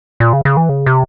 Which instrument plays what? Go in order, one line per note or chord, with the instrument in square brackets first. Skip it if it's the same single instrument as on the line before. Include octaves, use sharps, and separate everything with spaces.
[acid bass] A#2
C#3
C#3
E3
C#3
C3